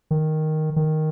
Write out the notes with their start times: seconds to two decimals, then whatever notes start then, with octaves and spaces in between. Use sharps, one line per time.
0.11 D#3
0.76 D#3